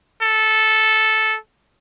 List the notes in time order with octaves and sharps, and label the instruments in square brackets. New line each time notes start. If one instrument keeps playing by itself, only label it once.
[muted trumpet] A4